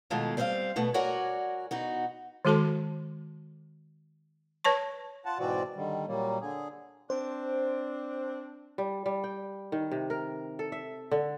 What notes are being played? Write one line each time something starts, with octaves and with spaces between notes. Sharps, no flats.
B2 D#3 G#3 A3 F4
G3 C4 C5 D5 F5
B2 A3 B3
F#4 A#4 C#5 D5 F#5 G#5
B2 D#4 F#4
D#3 G#3 F#4 A4 A5 C6
B4 C#5 A5 C#6
F4 F#5 A5
G#2 B2 E3 C4 F#4 D5
D3 D#3 G3
A#2 F#3 G3 A#3
D3 G#4
C4 D4 C5
G3
G3
G5
D#3
C3
A#4
A4
E5
D3